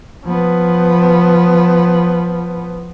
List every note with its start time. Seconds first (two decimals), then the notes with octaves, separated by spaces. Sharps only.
0.25 F3 B3